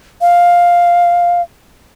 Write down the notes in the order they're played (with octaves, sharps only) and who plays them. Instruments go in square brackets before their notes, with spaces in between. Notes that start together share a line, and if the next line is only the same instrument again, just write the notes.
[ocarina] F5